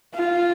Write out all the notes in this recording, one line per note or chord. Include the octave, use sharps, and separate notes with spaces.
F4